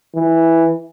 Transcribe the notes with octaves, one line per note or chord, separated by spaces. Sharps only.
E3